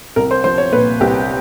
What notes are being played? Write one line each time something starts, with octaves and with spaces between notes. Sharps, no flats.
C2 A#4
C5
F3 C5
C#5
A#2 B4
C2 G4